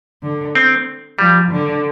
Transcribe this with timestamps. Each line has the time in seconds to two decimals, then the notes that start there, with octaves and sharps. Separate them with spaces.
0.23 D3
0.55 C4
1.19 F3 G3
1.52 D3